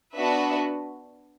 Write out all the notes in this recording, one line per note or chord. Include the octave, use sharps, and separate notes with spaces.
B3 D4 F#4 B4 E5